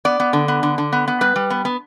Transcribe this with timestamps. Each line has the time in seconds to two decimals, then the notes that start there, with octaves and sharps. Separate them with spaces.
0.05 B3 D5
0.20 B3
0.33 D3
0.48 B3
0.63 D3
0.78 D3
0.93 B3
1.08 B3
1.21 G3 B4
1.36 G3
1.50 B3
1.65 B3